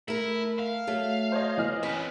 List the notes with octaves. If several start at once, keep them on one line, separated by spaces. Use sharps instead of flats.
A3 E4 A#4
F5
F#3 A3
C5 C#5 D#5
E3 D#5 F6
C4 C#4 B4